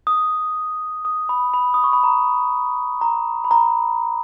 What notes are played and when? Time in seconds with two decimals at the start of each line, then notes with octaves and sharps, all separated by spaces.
0.07 D#6
1.05 D#6
1.29 B5
1.54 B5
1.74 D#6
1.84 C#6
1.93 B5
2.04 A#5
3.01 A#5
3.44 B5
3.51 A#5